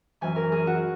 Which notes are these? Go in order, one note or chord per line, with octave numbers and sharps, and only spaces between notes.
F#2 E3 G#5
A#4
G#4
F#4